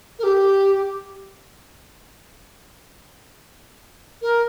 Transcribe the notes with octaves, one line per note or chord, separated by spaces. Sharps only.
A#4
G4
A#4